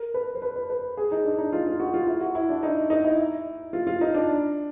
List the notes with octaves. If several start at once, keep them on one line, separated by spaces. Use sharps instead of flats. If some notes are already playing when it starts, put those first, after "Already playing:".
Already playing: A#4
B4
C5
B4
B4
B4
G#4
D#4
D4
D#4
F4
F4
F#4
F4
E4
F#4
E4
D4
D#4
D#4
E4
F4
F4
D#4
D4